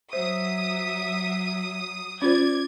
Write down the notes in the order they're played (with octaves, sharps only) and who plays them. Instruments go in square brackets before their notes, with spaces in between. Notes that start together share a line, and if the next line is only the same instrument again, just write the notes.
[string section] F#3 D#6 [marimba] C5 [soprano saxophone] E5
[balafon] C#4 F4 C5 [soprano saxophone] D5 [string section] G#6